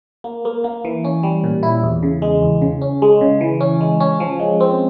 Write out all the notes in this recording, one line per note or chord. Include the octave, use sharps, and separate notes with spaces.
A#3
A#3
A#3
E3
C#4
G3
A#2
E4
E2
C#3
G#3
E2
C#3
C#4
G#3
C#3
E3
C#4
G#3
C#4
F3
G#3
C4